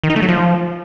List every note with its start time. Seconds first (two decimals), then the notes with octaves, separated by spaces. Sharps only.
0.04 D#3
0.10 D#4
0.16 A3
0.22 F#3
0.29 F3